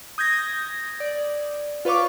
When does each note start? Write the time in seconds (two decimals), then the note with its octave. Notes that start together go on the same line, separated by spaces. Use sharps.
0.18 D#6 G6 G#6 A#6
1.00 D5
1.85 F4 B4 C#5 F5 C#6 D6